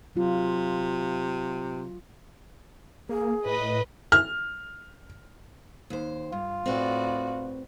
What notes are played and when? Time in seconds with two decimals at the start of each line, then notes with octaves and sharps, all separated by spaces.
0.16 C3 F#3 F4
3.09 A#3 G#4
3.46 A2 B4 D#5
4.12 F6
5.90 D#2 C5
6.32 G2 F4
6.66 A2 C4 F#4 B4 D5